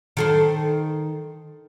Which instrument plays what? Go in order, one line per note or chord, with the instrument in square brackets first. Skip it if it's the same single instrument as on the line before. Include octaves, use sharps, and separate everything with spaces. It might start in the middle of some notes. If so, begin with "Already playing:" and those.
[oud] D#3 A4 C5